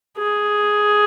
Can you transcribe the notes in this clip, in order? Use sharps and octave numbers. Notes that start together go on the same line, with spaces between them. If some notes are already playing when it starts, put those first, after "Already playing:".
G#4